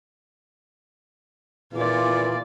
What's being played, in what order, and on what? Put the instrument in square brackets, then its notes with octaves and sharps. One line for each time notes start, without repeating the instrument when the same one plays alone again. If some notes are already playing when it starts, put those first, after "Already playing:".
[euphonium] E2 [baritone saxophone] A#2 [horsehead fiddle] F4 D5